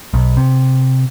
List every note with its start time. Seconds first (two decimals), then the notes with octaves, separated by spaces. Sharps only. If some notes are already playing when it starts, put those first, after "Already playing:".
0.14 B1
0.37 C3